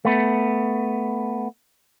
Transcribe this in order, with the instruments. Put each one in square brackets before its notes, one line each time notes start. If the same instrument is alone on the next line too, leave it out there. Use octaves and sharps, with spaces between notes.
[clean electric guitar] A3 B3